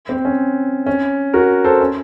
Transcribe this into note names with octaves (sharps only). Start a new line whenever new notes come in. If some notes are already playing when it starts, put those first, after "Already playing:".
C4
C#4
C#4
F#4 A#4
A4 C5
C#4